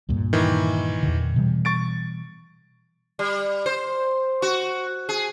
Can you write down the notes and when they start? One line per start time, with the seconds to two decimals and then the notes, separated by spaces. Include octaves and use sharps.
0.09 D2 G2 A#2
0.33 D#3 E3
1.03 E2 A#2 D3
1.36 B2 E3 G3
1.65 C#6 A6 D7
3.19 G3
3.66 C5
4.42 F#4
5.09 G#4